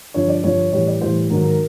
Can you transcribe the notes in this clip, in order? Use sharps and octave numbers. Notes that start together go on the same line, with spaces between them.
G2 D3 F3 C#5
D5
G2 D3 F3 C#5
A2 E3 G3 C#5
D5
A2 E3 G3 C5
G#2 D#3 F#3 A#4
A#4